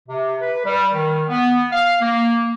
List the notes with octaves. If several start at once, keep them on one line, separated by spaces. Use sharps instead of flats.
C3
B4
G3
D#3
B3
F5
A#3